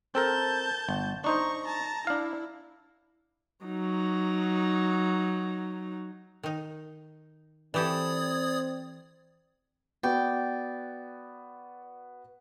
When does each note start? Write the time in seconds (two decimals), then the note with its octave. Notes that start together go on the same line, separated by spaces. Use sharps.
0.15 C4 A4 A#4 A5 G6
0.89 G1
1.24 D4 D#4 C5 A#5 C#6
1.64 A5 A#5
2.07 D4 E4 F5
3.66 F#3 D#4
6.43 D#3 D#4
7.74 E3 C4 G4 A4 D5 D#6 G#6
10.03 B3 F#4 D5 G5